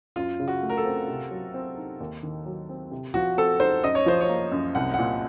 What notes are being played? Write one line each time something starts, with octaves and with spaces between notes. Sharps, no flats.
F#2 F4
C#3
F#4
A3
A#4
A4
C4
C3
F#3
C4
D#4
D#2
D#3
F#3
C4
C3
F3 F#4
C4 A4
D#4 C5
F#2 D#5
C#5
F3 C5
C#5
A#3
F#2
C2 F#5
A#2 F#5